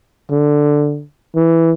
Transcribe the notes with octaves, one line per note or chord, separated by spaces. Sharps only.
D3
E3